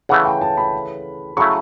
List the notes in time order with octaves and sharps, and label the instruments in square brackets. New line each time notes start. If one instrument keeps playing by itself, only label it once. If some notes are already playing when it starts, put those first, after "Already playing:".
[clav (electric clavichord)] C#3 E3 A3 [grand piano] F#5
[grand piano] G5
A5
B5
[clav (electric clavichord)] C#3 F#3 A3 E4 [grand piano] C#6